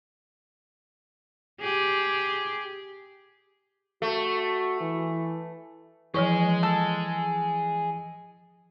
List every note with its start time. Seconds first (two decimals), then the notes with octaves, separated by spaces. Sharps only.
1.60 G4 G#4
4.02 A3 F#4
4.81 E3
6.14 E3 F3 G#4 C#5 D#5 C#6
6.63 A4